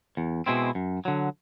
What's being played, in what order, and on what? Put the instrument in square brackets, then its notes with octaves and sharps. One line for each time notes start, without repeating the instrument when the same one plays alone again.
[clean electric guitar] E2
B2 G#3 C4 E4
F#2
D3 F#3